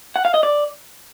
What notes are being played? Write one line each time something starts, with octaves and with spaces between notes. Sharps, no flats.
F#5
F5
D#5
D5